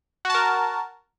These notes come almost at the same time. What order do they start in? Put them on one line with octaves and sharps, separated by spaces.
F#4 A5 A#4